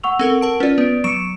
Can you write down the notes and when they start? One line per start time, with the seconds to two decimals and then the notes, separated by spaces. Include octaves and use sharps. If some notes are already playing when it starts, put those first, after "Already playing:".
0.04 F#5 C#6 E6 F7
0.19 C4 A4 A#4
0.41 A#4 A5 D7
0.60 C#4 F4 B4 D5
0.78 B3 D7
1.04 F#3 C#6 C#7 D7 E7